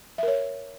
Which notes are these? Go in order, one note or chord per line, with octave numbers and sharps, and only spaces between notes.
A#4 C#5 E5